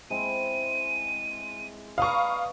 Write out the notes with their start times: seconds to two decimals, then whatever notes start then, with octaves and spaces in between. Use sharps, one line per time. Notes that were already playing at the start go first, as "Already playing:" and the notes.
0.10 G#3 C4 E4 D#7
1.98 B4 D5 F5 A#5 C#6 D#6